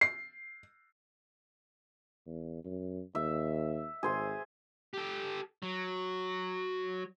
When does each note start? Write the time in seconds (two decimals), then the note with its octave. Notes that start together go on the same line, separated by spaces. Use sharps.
0.01 C7
2.27 E2
2.64 F#2
3.15 D#2 E5
4.03 G#1 G#4 C5 G#5
4.94 G4 A4
5.63 F#3